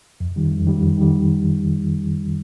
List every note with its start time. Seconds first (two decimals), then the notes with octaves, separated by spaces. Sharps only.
0.20 F2
0.36 D#3 G3
0.51 F2
0.67 D#3 G3
0.82 F2
0.97 D#3 G3